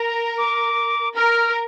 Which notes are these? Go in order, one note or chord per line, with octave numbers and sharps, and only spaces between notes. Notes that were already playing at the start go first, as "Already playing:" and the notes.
Already playing: A#4 A#5
D6
A#4 F6